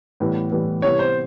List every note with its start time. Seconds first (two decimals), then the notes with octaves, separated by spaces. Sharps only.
0.20 A2 E3 G3 B3
0.52 A2 E3 G3 B3
0.82 C3 E3 G3 B3 E4 C#5
0.99 C5